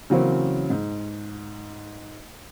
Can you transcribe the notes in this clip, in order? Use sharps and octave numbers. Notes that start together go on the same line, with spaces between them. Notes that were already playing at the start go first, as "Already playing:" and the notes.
C#3 E3 F#3 A#3 C4 C#4
G#2